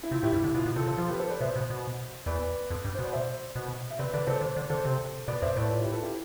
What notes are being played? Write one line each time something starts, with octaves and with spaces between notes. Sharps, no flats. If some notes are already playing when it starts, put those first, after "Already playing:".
E4
C3 F4
A2 E4 G4
G2 E4
D3 E4
B2 F4
B2
C3 F4 A4
C3 F4 A4
F3 F4 A4
G4 B4
A4 C5
B4 D5
B2 C5 E5
B2
B2
E2 B4 D5
F2
G2
B2 C5
D5
C5 E5
B2
E5
C3 B4 D5
D3 B4 D5
C3 A4 C5
D3 C5
D3 D5
D3 A4 C5
C3
B2 B4 D5
F2 C5 E5
A2 B4 D5
F4
E4 G4
B4
F4 A4
E4 G4